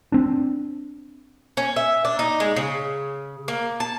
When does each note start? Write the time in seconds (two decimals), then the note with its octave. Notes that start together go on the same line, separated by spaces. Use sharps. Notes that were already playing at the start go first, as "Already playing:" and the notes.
0.12 C4 D4
1.57 C#4
1.76 E5
2.05 D4
2.19 D#4
2.40 G#3
2.56 C#3
3.48 A#3
3.80 A5